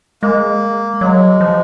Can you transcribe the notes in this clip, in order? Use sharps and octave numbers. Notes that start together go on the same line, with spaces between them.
G#3 A#3
F#3 G#3
F3